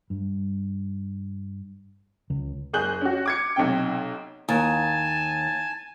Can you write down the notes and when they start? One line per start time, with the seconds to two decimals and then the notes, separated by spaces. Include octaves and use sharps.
0.10 G2
2.30 C#2
2.73 F#1 G#4 F#6 G6 F#7
3.02 C#4 F#4
3.26 D6 G#6 C#7
3.56 B1 C3 G5
4.49 D#2 G#5 A5